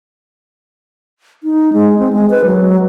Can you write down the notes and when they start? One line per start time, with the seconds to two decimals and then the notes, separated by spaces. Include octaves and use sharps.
1.43 D#4
1.73 G#3
1.99 C4
2.13 G#3
2.30 B4
2.45 F#3